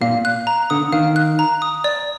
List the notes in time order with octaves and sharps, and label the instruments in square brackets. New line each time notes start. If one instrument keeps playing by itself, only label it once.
[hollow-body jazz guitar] A#2 [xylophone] F5
[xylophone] F#6
A#5
[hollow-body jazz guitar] D3 [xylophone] D#6
[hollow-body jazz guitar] D#3 [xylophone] F5
[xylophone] F#6
A#5
D#6
D5